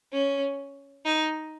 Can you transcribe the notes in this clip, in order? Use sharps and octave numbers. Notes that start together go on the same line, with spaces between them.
C#4
D#4